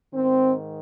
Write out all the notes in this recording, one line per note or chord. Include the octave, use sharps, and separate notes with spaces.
G#2 D#3 C4